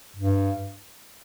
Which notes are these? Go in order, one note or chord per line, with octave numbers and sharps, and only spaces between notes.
G2